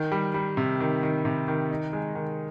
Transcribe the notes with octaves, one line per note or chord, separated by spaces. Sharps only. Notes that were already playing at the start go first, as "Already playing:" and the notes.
Already playing: D#3
G3
G3
C3
D#3
D#3
C3
D#3
D#4
G#3
D#3